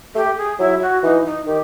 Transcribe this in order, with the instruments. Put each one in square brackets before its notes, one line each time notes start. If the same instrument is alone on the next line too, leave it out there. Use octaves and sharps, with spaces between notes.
[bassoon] A3 [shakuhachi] G4
[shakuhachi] G#4
[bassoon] F#3 [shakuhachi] E4
[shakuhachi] F#4
[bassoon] E3 [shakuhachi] D#4
[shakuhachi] D#4
[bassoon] D#3 [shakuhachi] G4